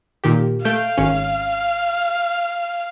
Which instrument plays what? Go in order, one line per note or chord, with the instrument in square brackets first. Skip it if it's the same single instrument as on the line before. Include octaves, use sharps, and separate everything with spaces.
[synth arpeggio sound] A#2 D#3 G4
[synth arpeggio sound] A3 G6 D7 [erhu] F5
[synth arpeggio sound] G#1 C#4